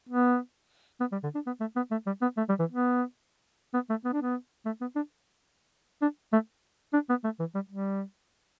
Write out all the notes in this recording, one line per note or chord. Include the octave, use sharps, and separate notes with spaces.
B3
B3
G3
D3
D4
B3
A3
B3
A3
G3
B3
A3
G3
E3
B3
B3
A3
B3
D4
B3
A3
B3
D4
D4
A3
D4
B3
A3
E3
G3
G3